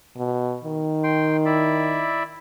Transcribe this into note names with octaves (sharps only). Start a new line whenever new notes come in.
B2
D#3
G5 C6
E4 D5 E5